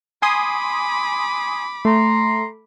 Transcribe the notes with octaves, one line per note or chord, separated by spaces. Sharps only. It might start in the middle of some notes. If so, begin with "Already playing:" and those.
G#5 B5 C6 D6 D#6
A3 A#5 C6